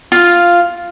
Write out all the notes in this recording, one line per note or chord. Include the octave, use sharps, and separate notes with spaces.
F4